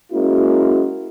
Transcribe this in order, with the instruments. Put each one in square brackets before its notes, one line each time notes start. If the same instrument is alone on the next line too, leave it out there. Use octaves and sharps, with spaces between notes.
[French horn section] G#3 A#3 C#4 E4 F#4